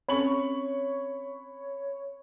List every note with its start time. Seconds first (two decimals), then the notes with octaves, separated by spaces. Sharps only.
0.09 C4 C#4 A4 C#5 B5 C#6 F#7